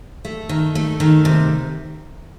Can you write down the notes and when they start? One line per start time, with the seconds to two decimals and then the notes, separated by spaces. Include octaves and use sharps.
0.25 A3
0.49 D#3
0.75 A3
1.00 D#3
1.25 C3